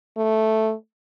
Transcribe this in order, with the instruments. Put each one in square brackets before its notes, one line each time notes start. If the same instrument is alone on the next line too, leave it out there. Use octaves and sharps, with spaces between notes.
[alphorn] A3